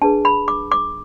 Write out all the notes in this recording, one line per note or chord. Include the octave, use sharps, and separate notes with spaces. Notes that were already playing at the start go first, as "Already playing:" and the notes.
D4 G#4 B4 A5
B5
D6
D6